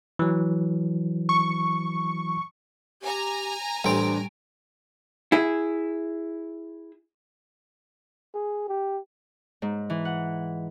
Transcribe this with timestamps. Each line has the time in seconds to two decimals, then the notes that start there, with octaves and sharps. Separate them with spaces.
0.19 E3 F#3
1.29 C#6
3.02 G4 G#5 A#5
3.84 A1 G3 C4 D4 D7
5.32 E4 G#4
8.34 G#4
8.68 G4
9.62 G#2
9.90 E3
10.05 F#5